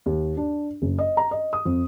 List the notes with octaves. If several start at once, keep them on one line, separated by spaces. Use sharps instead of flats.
D#2
D4
F#1
D#5
A#5
D#5
D#6
F2